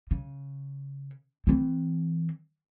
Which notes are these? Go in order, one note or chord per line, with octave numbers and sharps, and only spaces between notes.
C#3
E3 C4